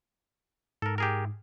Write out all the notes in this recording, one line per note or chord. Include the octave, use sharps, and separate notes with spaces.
G#2 A4 A#4
G4 G#4 A#4